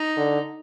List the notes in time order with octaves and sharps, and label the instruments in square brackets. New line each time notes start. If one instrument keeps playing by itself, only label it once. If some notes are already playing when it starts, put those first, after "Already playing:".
Already playing: [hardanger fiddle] D#4
[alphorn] D3